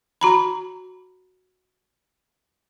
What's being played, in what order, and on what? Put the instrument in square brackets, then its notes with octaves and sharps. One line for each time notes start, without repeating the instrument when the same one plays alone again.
[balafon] F#4 A#5 B5